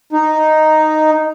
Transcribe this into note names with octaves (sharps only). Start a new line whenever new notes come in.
D#4